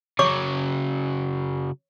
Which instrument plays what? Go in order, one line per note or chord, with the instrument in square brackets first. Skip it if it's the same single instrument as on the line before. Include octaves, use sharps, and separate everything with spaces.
[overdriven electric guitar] C#3 F#3 [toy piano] C#5 C#6 D6